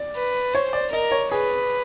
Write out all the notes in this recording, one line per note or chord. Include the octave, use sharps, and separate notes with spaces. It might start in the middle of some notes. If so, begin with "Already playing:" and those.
Already playing: D5
B4
C5 C#5
D5
A#4 D#5
C#5
G#4 B4